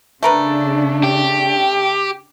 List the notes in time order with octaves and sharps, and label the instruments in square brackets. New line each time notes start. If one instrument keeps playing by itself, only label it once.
[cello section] C#3 D4 [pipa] A3 A#4 B4
[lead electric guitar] G4